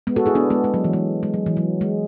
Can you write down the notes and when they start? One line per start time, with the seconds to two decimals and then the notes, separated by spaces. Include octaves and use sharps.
0.07 G#3 B3
0.16 F#4 A4
0.26 E4 G#4
0.35 B3 D4
0.50 G#3 B3
0.64 G#3
0.74 F#3
0.84 E3
0.93 G#3
1.23 G#3
1.34 F#3
1.46 E3
1.57 F#3
1.81 G#3